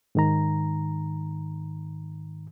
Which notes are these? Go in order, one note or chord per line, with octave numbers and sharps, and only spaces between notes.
G#2 D#3 A#5